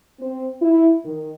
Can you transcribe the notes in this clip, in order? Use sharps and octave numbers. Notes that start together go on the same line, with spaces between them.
C4
E4
D#3